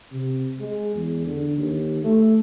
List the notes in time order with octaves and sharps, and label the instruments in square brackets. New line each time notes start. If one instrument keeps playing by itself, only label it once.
[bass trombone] C3
G#3
E2
D3
D#2
A3